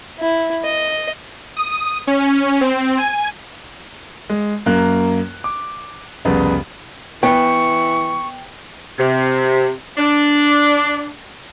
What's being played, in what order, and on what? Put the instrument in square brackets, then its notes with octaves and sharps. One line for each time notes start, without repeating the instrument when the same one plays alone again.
[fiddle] E4
D#5
[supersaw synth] D#6
C#4
C4
G#5
[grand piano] G#3
F#2 A#3 F#6
D6
C2 F2 C#3 B3
[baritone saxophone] E3 [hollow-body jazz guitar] B3 [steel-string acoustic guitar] G5 [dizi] C#6
[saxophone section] C3
D4